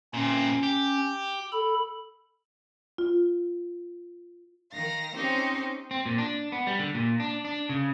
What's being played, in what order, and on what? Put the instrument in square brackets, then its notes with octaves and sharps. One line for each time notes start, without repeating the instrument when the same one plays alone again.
[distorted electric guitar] A#2 C4 [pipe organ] C#4
[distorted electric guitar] G4
[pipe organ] A4 B5
[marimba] F4
[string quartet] D#3 F5 A#6
C4 C#4 D#4 G4 C5
[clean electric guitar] C4
A#2
D4
B3
G3
D3
A#2
D4
D4
C#3